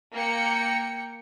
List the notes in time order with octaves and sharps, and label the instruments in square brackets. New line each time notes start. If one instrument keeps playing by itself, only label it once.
[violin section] A#3 G5 C#7